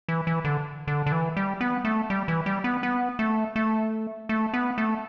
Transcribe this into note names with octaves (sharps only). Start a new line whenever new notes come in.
E3
E3
D3
D3
D3
E3
G3
B3
A3
G3
E3
G3
B3
B3
A3
A3
A3
B3
A3